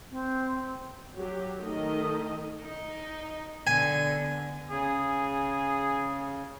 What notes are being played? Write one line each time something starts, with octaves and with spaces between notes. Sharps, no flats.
C4
F#3 G4
D#3 A3 D#5
D#4
D3 B3 G#5
C#3 G#4